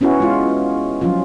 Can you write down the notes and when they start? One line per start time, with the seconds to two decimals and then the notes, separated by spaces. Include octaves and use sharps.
0.01 B3 C#4 E4 F#4
0.20 G#3 F4
1.01 F3 F#3 C#4 F4